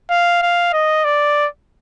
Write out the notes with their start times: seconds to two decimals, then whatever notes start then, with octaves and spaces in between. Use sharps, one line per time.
0.10 F5
0.42 F5
0.73 D#5
1.04 D5